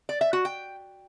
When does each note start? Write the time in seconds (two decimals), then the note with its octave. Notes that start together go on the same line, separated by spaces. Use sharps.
0.09 D5
0.21 E5
0.33 F#4
0.45 G5